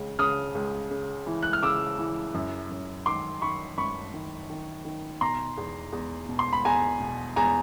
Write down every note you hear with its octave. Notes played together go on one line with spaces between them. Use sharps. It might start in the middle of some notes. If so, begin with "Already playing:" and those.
Already playing: C#2 C#3
C#3 D#6 F6
C#2
C#3
E3
F#6
F6
C#3 D6 E6
E3
F#2
F#2
D#3 C6 D6
D#3 B5 C#6
F#2 B5 C#6
D#3
D#3
D#3
B2 A#5 C6
E2
E2
B2
C6
B5
E2 G#5 A#5
B2
E2 G#5 A#5